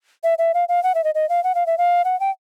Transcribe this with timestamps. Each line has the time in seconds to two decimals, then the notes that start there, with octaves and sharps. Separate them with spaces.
0.24 E5
0.38 E5
0.54 F5
0.69 F5
0.83 F#5
0.95 E5
1.04 D#5
1.15 D#5
1.29 F5
1.44 F#5
1.55 F5
1.67 E5
1.78 F5
2.05 F#5
2.20 G5